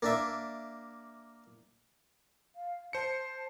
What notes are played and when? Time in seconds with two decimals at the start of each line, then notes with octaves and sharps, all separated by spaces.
0.02 A#3 D4 E5
2.56 F5
2.93 C5 A5 C#7